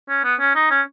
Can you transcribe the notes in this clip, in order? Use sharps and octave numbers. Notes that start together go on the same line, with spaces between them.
C#4
B3
C#4
D#4
C#4